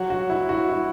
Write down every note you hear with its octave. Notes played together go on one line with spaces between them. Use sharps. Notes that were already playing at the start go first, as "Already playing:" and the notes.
Already playing: F#3 F#4
F#4
E4
F#4
E4